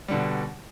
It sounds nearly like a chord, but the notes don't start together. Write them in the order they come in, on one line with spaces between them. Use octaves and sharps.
G3 D3 B2